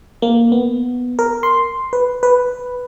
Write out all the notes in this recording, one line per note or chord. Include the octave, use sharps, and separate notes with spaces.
A#3
B3
A#4
C6
B4
B4